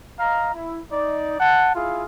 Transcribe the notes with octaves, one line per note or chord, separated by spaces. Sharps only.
D#5 F5 A#5
E4
D#4 D5
F#5 A5
E4 F4 G#4 F5